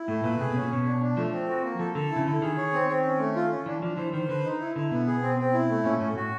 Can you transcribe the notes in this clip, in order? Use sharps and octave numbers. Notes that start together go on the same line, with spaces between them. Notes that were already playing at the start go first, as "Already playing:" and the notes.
Already playing: E4
A2 A3
A#2 B4
C3 G#4
B2 C#4
A#2
B2 C#5
D4
D4
F3 A3
C4
F#4
A#3
F3 A4
D3 A4
E4
C#3
D3 E4
D#3 G#4
C#5
C4
C4
C#4
A3
F4
C#4
E3 D4
F3 D4
E3 C5
D#3 C5
D3 B4
D#4
E4
D3 E4
B2 B3
G#4
C4
C4
E4
A3
A#2 C#4
A2 C#4
A2 F#4